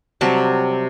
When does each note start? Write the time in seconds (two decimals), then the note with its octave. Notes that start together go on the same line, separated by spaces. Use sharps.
0.21 C3 F#3 G3 A5